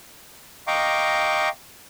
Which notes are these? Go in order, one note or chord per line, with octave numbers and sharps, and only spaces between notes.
D#5 F5 G5 A#5 C#6 D6